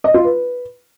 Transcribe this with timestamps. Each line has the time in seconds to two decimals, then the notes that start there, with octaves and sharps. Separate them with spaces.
0.04 D#5
0.14 F4
0.24 B4